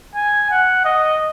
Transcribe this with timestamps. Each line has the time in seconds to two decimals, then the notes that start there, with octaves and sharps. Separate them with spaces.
0.15 G#5
0.51 F#5
0.85 D#5